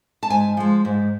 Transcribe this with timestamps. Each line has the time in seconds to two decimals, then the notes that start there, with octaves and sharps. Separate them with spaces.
0.23 A5
0.30 G#2 G#5
0.57 F3 G#3
0.85 G#2